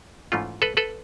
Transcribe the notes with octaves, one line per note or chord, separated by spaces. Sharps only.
G#2 E3 A3 C#4 F4
A4 B4
A4 B4